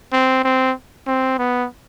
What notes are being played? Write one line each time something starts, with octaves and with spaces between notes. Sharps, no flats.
C4
C4
C4
B3